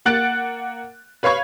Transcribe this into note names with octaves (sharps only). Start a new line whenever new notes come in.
A#3 F#5 F#6 A6 D7
B4 C#5 F5 B5 C#6 G#6